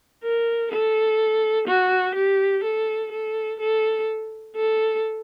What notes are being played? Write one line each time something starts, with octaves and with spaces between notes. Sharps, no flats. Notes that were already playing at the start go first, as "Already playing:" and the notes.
A#4
A4
F#4
G4
A4
A4
A4
A4